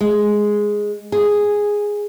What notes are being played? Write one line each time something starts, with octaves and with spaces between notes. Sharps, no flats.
G#3
G#4